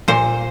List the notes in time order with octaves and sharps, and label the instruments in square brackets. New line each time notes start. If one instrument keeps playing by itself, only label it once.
[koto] A#2 C5